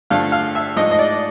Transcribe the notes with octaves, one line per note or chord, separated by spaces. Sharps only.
G2 D3 F3 A3 F5
F5
E5
G#2 F3 A3 D#5
D#5
D5